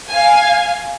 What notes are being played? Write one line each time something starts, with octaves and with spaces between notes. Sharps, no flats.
F5 G#5